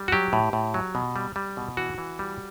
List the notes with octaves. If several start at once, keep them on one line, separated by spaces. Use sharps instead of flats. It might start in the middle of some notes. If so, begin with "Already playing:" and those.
Already playing: G3
F#4
F#3 G4
A2
A2
F#3
B2
G3
G3
B2
E3 F#4
E3
G3